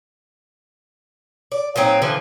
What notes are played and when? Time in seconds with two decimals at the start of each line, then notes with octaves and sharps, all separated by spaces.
1.52 D5
1.76 A#2 F#3 C4 D#4
2.02 D3 E3 F3